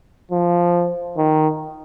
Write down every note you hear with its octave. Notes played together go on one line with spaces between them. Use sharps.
F3
D#3